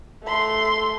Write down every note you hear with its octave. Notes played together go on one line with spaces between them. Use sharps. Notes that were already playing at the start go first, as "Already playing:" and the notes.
A3 C6